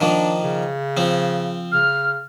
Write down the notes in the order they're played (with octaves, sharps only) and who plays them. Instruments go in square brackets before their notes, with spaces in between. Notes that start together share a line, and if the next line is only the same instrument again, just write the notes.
[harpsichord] D#3 F3 A#3 [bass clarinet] D4
[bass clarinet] C#3
[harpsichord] F3 C4
[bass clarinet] C#3 [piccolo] F6